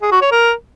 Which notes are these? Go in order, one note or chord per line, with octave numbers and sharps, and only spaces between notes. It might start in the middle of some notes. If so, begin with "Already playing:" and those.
G#4
F#4
C#5
A#4